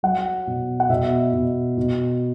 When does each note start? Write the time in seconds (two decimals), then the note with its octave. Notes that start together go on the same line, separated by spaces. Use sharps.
0.03 F#3 F#5
0.47 B2
0.80 F#5
0.90 B2 E5
1.33 B2
1.77 B2